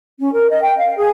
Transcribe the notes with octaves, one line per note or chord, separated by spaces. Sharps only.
C#4
A#4
D#5
G5
F5
G#4